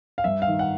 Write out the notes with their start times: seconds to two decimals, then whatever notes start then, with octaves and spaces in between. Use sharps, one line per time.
0.18 F5
0.24 G2 E5
0.42 F5
0.48 D#3
0.59 F#5